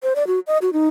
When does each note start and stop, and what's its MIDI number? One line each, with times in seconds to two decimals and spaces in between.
0.03 0.13 72
0.16 0.26 74
0.27 0.40 66
0.47 0.58 75
0.62 0.70 66
0.73 0.88 63